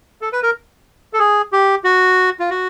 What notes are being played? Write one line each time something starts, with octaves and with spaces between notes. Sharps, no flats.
A4
B4
A#4
A4
G#4
G4
F#4
F4
F#4